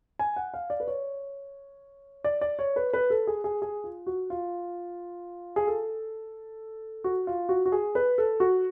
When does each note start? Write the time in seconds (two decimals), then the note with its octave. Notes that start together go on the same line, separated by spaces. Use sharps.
0.19 G#5
0.36 F#5
0.54 F5
0.70 D5
0.80 B4
0.88 C#5
2.24 D5
2.41 D5
2.59 C#5
2.76 B4
2.93 B4
3.10 A4
3.27 G#4
3.44 G#4
3.62 G#4
3.84 F4
4.07 F#4
4.30 F4
5.56 G#4
5.67 A4
7.04 F#4
7.27 F4
7.49 F#4
7.66 F#4
7.72 G#4
7.95 B4
8.18 A4
8.40 F#4